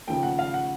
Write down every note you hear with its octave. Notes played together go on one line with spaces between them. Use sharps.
D#2 C#3 F3 A3 G5
F#5
F5
F#5